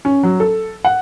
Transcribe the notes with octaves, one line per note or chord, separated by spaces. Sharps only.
C#4
F#3
A4
F#5